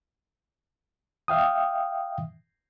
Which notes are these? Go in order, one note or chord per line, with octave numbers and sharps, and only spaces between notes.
E5 F5 G5 D#6